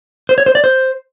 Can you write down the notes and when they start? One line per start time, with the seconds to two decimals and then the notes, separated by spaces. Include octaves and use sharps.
0.29 C5
0.38 C#5
0.46 C5
0.55 D5
0.64 C5